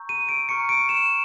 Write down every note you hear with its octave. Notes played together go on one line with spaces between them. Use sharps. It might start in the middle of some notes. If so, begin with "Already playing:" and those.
Already playing: A#5 C#6 E6 G6
D#7
D7
A#5 C#6 F6 C#7
D7
E7